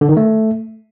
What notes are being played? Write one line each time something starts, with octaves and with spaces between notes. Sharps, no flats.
D3
D#3
A3